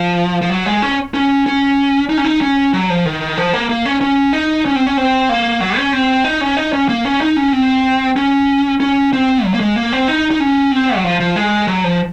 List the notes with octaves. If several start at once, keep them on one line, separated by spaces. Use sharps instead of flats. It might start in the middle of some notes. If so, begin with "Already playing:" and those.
Already playing: F3
F3
F#3
G#3
C#4
C#4
C#4
D#4
C#4
D#4
C#4
F#3
F3
D#3
F3
A#3
A#3
C#4
C#4
D#4
C#4
C4
C#4
C4
A#3
F#3
C#4
C4
D#4
C#4
D#4
C#4
A#3
C#4
D#4
C#4
C4
C#4
C#4
C4
F#3
A#3
G#3
A#3
C4
D#4
D#4
C#4
C4
F#3
F3
F3
G#3
F#3
F3